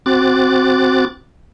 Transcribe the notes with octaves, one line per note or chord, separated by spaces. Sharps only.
C4 F#4 D6 F#6 A6